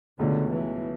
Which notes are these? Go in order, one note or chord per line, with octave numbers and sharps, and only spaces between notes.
C#2 B2 D3 A3 C#4
E3